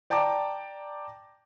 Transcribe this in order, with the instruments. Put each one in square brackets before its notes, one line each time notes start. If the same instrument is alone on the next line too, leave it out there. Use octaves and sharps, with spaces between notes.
[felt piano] D5 G5 A5 A#5 D6